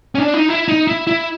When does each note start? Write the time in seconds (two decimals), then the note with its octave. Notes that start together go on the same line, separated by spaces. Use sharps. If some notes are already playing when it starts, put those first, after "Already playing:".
0.15 C#4
0.19 D4
0.34 D#4
0.49 E4
0.68 D#4
0.88 E4
1.07 E4